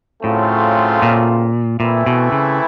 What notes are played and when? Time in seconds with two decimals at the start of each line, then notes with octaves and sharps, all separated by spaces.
0.23 A2 C#3 F#3 A3 C4 F4
1.02 A#2
1.80 A#2 E3 A3 C4 E4
2.06 B2
2.32 C#3